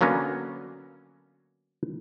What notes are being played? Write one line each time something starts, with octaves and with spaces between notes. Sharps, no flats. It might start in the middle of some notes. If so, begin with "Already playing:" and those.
D3 F#3 A#3 B3 C#4